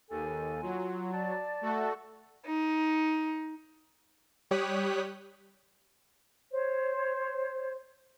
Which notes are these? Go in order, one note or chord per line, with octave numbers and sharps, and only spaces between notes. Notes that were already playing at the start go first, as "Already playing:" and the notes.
D#2 A4 G#5
F#3 F4
D5 A5
A3 F#4 A4
D#4
G3 G4 C#5 D#6 F#6 B6
C5 C#5